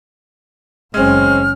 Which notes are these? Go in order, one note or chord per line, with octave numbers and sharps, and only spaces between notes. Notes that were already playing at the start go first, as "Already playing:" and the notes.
F#1 G#3 C4 C#4 F6